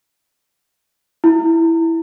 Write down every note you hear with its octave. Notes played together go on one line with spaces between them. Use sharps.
E4